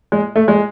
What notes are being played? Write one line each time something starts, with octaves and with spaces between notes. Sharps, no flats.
G#3
A3
G#3